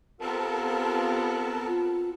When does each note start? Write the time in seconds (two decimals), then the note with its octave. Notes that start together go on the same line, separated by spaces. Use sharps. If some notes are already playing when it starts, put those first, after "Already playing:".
0.21 B3 C4 F4 G4 A4 A#4 A5
1.67 F4